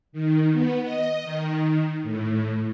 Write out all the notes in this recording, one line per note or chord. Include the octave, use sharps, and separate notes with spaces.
D#3
B3
D#5
D#3
A2